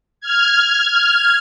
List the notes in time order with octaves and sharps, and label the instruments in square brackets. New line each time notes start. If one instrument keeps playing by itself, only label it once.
[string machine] F6 G#6